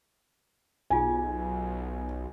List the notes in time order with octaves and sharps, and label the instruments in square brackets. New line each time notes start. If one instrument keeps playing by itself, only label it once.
[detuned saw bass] B1 [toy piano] D#4 F4 G#4 [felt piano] G#5